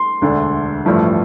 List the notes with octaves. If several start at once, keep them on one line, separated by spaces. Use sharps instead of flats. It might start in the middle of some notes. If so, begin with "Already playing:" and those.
Already playing: C6
E1 D2 D3 A3 D4
A1 G2 F3 A3